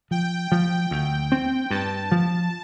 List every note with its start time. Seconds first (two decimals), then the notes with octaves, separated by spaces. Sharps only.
0.11 F3 G5
0.52 F3
0.91 D2
1.32 C4
1.70 G2 A5
2.12 F3